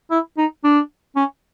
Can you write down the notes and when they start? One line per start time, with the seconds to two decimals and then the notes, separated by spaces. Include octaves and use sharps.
0.11 E4
0.38 D#4
0.64 D4
1.16 C#4